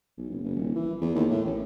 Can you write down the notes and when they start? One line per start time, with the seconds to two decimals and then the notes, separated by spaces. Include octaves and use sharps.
0.18 B1
0.30 F#1
0.44 F#1
0.56 D#1
0.75 E3
1.01 E2
1.15 D#2
1.30 A2
1.46 A1